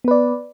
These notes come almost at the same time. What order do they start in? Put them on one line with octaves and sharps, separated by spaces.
B3 B4 D5